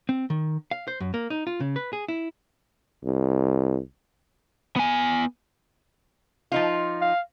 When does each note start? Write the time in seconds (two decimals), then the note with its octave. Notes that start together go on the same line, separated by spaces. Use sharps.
0.09 C4
0.30 D#3
0.71 F5
0.88 C5
1.00 F#2
1.14 A#3
1.30 D#4
1.47 F4
1.60 C#3
1.76 B4
1.93 G#4
2.08 E4
3.05 C2
4.76 B3 G#5
6.52 F3 D#4 F4
7.01 F5